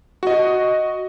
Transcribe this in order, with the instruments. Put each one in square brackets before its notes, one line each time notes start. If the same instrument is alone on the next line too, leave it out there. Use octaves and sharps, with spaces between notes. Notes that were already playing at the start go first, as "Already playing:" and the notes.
[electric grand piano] F#4 D#5